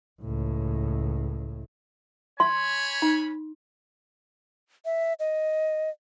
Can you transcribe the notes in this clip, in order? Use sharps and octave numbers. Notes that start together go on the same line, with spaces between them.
C#2 A2
C#5 G#5 B5 C6
D#4
E5
D#5